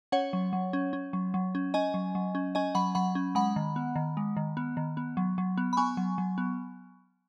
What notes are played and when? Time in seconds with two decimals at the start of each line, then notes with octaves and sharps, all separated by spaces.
0.12 C#4 C#5 F#5
0.33 F#3
0.53 F#3
0.73 C#4
0.93 C#4
1.13 F#3
1.34 F#3
1.55 C#4
1.74 C#4 D#5 G#5
1.94 F#3
2.15 F#3
2.35 C#4
2.55 C#4 D#5 G#5
2.75 F#3 F#5 B5
2.95 F#3 F#5 B5
3.15 C#4
3.35 G#3 F#5 B5
3.56 D#3
3.76 B3
3.96 D#3
4.17 G#3
4.37 D#3
4.57 B3
4.77 D#3
4.97 B3
5.17 F#3
5.38 F#3
5.57 B3
5.73 B5
5.77 B3 G#5 C#6
5.97 F#3
6.18 F#3
6.38 B3